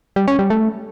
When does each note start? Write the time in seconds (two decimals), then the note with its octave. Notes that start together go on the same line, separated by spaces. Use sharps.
0.16 G3
0.28 C#4
0.39 G3
0.50 A3